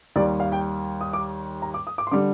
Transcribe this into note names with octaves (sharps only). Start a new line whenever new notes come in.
D#2 D#3 G3 D5
F5
G5
D#6
D6
A#5
D6
D#6
D6
C6
D3 G3 D6